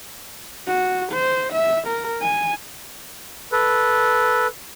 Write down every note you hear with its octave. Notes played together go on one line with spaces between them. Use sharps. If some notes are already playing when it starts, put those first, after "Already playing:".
F#4
C5
E5
A#4
G#5
A4 B4